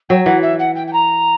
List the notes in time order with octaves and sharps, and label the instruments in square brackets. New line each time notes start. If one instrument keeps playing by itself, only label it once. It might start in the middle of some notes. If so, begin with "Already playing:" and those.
[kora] F#3 [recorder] G5
[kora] E3 [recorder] F#5
[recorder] E5
F#5
G5
G5
A#5